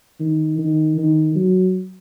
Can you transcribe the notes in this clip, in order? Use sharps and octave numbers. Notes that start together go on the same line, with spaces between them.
D#3
D#3
D#3
F#3